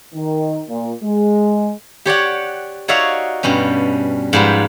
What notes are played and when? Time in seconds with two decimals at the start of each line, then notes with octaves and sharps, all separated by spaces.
0.14 D#3
0.69 A#2
1.03 G#3
2.06 G4 C#5 D5 F#5
2.88 D#4 F#4 C#5 D5 E5 F5
3.43 G2 B2 G3 C#4
4.33 G#2 F3 G3 B4